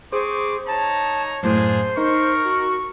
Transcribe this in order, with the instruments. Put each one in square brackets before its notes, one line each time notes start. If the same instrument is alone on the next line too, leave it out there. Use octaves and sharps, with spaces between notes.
[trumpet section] C4 C#6 D6 [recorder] G#4 [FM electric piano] C5
[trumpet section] D#4 C#5 A#5 [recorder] A5
[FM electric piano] F#2 A2 [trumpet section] A#3 D4 G#4 [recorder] C5
[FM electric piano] D#4 [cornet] A#4 [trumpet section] C#6
[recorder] F#4